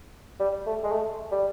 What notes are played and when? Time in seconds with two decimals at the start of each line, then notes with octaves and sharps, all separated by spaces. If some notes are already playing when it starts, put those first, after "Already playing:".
0.40 G3
0.66 A3
0.83 G#3
0.92 A3
1.32 G3